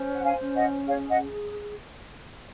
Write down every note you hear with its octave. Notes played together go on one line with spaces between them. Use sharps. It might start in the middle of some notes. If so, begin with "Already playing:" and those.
Already playing: C#4 C5
F#5
F5 G#5
C#4
D#5 F#5
G#4 C#5 F5
D#5 F#5